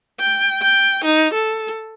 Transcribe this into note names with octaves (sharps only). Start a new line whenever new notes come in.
G5
G5
D#4
A4